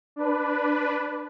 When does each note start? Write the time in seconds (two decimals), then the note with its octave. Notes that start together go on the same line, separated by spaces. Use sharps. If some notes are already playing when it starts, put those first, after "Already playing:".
0.16 D4 B4